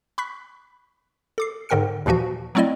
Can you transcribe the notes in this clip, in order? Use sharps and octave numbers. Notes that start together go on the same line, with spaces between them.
B5 C#6 F#6 B6
A4 D6 C7
G#2 D3 A#4 G5 F6 C#7
D#2 A#2 E3 F3 F#4
F#3 A3 C4 E4 D5 D#5